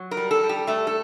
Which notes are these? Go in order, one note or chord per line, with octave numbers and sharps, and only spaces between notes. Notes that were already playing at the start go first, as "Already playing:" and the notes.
Already playing: F#3
A#4
G3
A4
G3
G4
A3 A4
A4